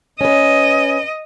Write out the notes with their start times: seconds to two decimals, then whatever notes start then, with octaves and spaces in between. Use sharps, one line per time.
0.21 C#4 B4 D#5